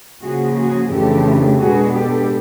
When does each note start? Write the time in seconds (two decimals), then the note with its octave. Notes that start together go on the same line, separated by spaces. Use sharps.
0.21 C#3 F3 A#3 F#4 G#4
0.56 F#4 G#4
0.91 F2 C#3 E3 A3 D4 G4 A4
1.61 B2 G#3 B3 D4 F#4 G#4
1.96 G4 A4